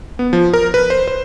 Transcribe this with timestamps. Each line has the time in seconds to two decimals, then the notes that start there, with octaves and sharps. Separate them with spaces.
0.19 B3
0.33 F3
0.53 A#4
0.74 B4
0.90 C5
1.08 C5